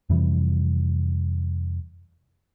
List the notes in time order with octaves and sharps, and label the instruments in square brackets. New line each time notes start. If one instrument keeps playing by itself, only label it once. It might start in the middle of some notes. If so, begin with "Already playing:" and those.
[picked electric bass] F2 C3 E3 G3